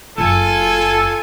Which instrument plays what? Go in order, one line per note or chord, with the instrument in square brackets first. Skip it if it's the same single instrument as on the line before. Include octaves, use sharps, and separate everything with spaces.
[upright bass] F#1 [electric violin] F4 G#5 [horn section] A4